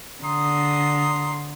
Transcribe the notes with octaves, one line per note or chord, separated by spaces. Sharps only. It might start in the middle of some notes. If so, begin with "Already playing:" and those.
D3 A#5 C6 D#6